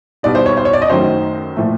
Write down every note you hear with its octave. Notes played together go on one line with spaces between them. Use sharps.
B2 G3 B3 D#4 D5
C5
C#5
C5
C#5
D5
D#5
F#2 D#3 F#3 A3 C5
A#2 F3 A3